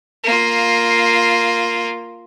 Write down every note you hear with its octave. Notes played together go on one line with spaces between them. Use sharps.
A#3 F4